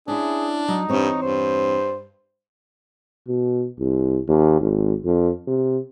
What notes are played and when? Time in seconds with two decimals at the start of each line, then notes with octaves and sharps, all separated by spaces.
0.08 C#4 D4 E4 G#4
0.68 F#3 D#4
0.89 E2 G2 C4 C#5
1.22 G2 C5
3.28 B2
3.79 C2
4.28 D#2
4.61 G#1
5.05 F2
5.48 C3